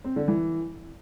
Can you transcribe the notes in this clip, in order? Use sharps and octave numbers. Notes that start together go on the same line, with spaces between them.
C4
D3
E3